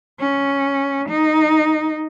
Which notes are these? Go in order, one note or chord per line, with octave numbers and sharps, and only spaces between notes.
C#4
D#4